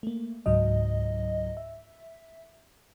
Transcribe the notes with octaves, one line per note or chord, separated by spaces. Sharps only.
A3 A#3
C#2 G#2 F#3 D#5
E5